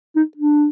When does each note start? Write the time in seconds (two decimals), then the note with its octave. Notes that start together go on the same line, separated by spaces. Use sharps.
0.16 D#4
0.37 D4